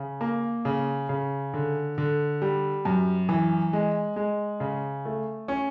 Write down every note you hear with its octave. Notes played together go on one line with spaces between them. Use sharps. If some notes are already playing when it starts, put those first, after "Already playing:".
Already playing: C#3
A#3
C#3
C#3
D3
D3
G3
F#2
E3
G#3
G#3
C#3
A3
C#4